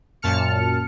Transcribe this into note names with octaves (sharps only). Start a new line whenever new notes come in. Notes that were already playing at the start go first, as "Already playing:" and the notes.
F#2 A#2 A5 F6 C#7